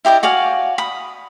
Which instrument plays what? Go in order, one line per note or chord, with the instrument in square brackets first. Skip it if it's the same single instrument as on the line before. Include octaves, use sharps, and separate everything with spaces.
[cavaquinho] E4 G4 D5 D#5
F#4 D5 F5 G#5
B5 D#6